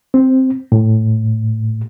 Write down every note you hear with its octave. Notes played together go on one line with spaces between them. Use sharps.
C4
A2